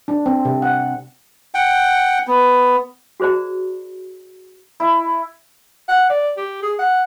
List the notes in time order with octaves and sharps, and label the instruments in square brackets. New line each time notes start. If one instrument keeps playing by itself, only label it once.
[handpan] D4
C4
C3
F#5
[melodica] F#5 G5
B3
[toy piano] F#4 G#4 C5 D5 A#5
[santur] E4
[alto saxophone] F#5
D5
G4
G#4
F#5